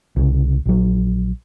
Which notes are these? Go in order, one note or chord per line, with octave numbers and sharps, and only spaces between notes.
C2 C#3
A#1 F#3